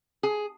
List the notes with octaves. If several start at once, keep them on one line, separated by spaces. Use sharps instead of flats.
G#4